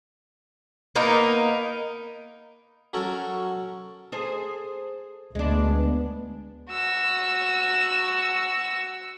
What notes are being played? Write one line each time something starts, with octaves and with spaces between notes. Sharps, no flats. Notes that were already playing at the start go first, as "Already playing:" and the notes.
A#3 B3 D#4 A#4
F#3 C#4 F#4 A4 A#4 C#5
G#4 A4 C5
D2 G#3 B3 D4
F#4 E6